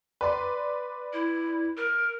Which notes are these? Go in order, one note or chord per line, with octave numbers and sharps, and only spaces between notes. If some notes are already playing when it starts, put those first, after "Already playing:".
B4 D5 C6
E4
A#4